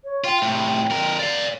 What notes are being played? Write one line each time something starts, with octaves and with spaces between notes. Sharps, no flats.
C#5
F4 G5
A2 C3
F2 A#4
D5 F5